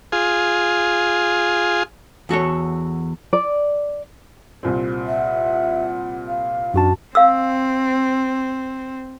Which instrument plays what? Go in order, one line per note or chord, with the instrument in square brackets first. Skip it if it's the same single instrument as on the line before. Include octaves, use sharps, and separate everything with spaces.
[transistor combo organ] F4 G#4
[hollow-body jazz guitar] E2 F#4 A4 C#5
[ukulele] D5
[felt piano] C2 A#2 C4
[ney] E5 [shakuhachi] F#5
[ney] F5
[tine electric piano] F#2 F#4 A5 [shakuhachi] D4
[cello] C4 [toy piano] F5 E6